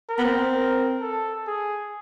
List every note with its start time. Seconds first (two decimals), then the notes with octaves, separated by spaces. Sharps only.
0.09 A#4
0.18 B3
0.24 C4
0.54 A#4
1.01 A4
1.47 G#4